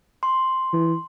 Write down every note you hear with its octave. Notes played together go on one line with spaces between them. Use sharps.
C6
E3